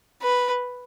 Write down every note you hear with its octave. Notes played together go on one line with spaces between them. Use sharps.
B4